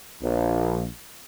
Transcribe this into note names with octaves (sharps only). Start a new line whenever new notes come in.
A#1